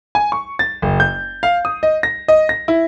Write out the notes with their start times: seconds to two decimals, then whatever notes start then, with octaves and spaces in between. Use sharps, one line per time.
0.15 G#5
0.32 C#6
0.59 A6
0.82 F#1
1.00 G6
1.43 F5
1.65 D#6
1.83 D#5
2.03 A#6
2.28 D#5
2.49 A#6
2.68 E4